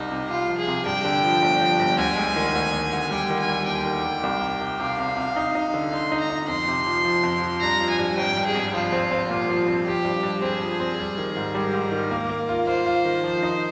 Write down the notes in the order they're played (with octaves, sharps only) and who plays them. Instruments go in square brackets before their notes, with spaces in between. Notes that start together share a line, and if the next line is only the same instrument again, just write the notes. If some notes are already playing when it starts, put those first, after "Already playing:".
Already playing: [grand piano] C2 C3 [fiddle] D#4
[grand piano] C3
[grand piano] C2 [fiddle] F4
[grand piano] F3
[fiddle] G#4
[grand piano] C3
[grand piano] G2 [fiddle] G5
[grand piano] D3
F3
G1
F3
G1
[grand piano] D2 [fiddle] G#5
[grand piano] G#3
D#3
D2
D2
D2
[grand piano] G3 [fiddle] G5
[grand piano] D#3
[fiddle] G#5
[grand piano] G3
[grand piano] D#2 [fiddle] G5
[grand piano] D#3
D#3
C2
C3
C3
[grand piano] C3 [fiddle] F5
[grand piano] C3
C3
D#4
D#4
D3
[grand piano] D#4 [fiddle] C6
[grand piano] D#4
[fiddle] A#5
[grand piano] D#4
[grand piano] F2 [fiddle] C6
[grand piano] C3
F3
F3
F2
F3
[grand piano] G2 [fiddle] A#5
[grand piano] F3
[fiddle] G#5
[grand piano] G2
[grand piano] G#1 [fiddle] G5
[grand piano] G2
[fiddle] G#4
[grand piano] G#1
[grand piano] F3 [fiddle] F4
[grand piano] C4
C4
A#2
F3
C4
[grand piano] F3 [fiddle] G4
[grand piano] G2
G2
[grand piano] C4 [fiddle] G#4
[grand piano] F3
C4
G3
D#3
G#2
[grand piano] G3 [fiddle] A#4
[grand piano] G#2
D#3
A#3
A#3
F4
[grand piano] F4 [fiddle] C5
[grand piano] F4
D#3
F3
D#4